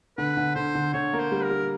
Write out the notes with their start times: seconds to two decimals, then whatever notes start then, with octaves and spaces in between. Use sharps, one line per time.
0.18 D3 B4
0.37 D3
0.55 D3 C5
0.75 D3
0.93 D3 C#5
1.13 A#3
1.20 C5
1.32 G3
1.44 A#4
1.50 G3